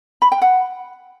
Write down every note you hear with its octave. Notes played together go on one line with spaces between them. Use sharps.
B5
G5
F#5